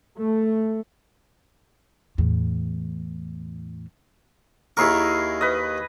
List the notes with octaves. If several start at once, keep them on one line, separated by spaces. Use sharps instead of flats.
A3
E2 A2
D#2 E4 G#4 A#4 C#6
B4 D#5